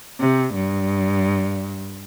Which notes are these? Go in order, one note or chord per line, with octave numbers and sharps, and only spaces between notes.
C3
G2